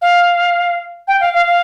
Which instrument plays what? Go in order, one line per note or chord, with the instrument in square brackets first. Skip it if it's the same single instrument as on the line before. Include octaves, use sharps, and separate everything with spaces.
[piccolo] F5
G5
F5
F5
F5